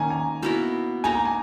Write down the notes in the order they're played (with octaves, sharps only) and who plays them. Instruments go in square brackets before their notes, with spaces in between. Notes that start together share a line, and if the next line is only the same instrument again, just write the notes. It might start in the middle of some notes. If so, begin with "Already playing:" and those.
Already playing: [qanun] D#3 A#3 C#4 [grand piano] G#5 A#5
[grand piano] G#5
[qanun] B2 A#3 E4 A#4
[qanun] A#3 D#4 A#4 [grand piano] G#5
[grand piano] A#5
G#5